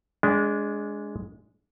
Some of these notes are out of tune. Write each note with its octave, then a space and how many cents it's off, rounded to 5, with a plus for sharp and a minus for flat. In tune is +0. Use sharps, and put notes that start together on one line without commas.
G#3 +0 D4 -20